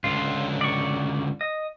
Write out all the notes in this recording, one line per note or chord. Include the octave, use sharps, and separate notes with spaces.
C#2 D3 F4
D5 C#6
D#5